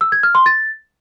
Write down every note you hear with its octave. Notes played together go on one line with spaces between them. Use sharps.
E6
G#6
F6
C6
A6